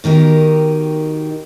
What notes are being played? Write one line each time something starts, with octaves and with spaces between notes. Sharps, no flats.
B2 D#3 D#4 G4 A#4